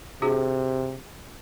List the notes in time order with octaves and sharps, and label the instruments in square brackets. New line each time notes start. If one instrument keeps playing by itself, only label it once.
[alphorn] C3 [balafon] D4 F#4 G#4